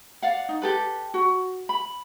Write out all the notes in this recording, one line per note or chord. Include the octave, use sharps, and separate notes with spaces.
D5 F5 F#5
D#4
G4 A4 B4
F#4
B5